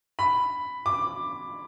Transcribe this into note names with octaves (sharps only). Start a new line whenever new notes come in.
B5
D6